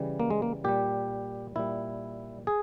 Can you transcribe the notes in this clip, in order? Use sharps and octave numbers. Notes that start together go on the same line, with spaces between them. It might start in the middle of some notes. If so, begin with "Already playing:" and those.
Already playing: C#3 E3 G3
A#3
G#3
A#3
A#2 G3 G4
A#2 G3 E4
G#4